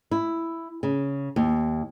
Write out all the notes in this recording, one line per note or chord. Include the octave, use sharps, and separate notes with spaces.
E4
C#3
D#2